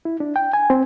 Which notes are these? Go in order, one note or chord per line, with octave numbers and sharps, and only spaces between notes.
E4
D4
G5
G#5
C4